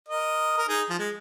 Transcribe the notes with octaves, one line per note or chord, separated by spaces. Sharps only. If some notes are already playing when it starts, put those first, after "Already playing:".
A#4 D#5
A#4
D#4 G#4
F3
G#3